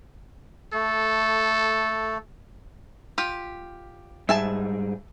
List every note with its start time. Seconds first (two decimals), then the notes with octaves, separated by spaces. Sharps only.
0.74 A3 A4
3.18 F4 G4
4.29 G#2 G3 G#4 E5 G#5 A5